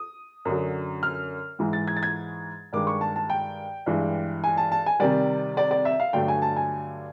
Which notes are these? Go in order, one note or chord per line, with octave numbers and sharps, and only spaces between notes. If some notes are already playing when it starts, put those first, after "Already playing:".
Already playing: D#6
F#2 D3 F#3
F6
G#2 E3 G#3
A6
G#6
A6
G#6
G2 D#3 G#3 D6
C#6
A5
A5
G5
G2 E3 G#3
G#5
A5
A5
G#5
C3 D#3 G3 D5
D5
D5
E5
F5
G2 D3 F#3 A3 G5
G#5
A5
G#5